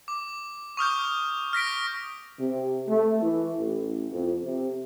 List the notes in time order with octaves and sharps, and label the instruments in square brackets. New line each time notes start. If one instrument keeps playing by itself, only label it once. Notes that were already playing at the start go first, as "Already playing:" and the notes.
[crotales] D6
C#6 D#6 F6 G6
F6 A#6 B6 D7
[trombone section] C3
A3
E3
A1
F2
C3